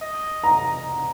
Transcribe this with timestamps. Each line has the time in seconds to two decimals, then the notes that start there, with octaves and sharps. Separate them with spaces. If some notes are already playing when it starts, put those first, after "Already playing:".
0.01 D#5
0.44 A#5